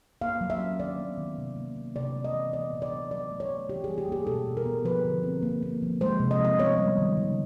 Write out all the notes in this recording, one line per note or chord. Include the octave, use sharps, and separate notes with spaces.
A#3 F5
F#3
E5
C#4
D#3 D5
B3
D#3
C3
A#3
A#3
C3 D5
G#3
D#5
E3
B3 D5
A#2
D5
F#3
F#3 D5
A3
C#5
A3
E3 G4
G3 G#4
G4
A#3 G#4
B2 A4
B2
A#4
B3
F3 B4
D3
C4
A#3
A#3
F3
G#3 C5
C3
D#5
F3
D#5
B3 C#5
G3
D#3
C#3